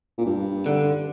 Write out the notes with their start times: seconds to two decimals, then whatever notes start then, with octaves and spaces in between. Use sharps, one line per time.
0.18 A#2
0.26 G2
0.66 D3